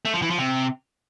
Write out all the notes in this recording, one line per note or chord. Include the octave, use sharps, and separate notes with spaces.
A3
F3
E3
F3
C3